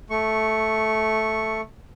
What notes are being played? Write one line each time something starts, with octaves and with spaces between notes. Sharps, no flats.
A3 C#6